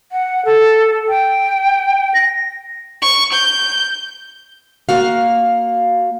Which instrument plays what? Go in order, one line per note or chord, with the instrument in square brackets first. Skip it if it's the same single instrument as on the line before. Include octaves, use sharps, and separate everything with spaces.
[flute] F#5
A4
G5
A#6
[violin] C#6
G6
[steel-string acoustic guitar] A#3 F#4 F5